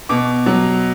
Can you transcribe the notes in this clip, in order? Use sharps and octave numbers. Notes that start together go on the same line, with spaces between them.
B2 D6
F#3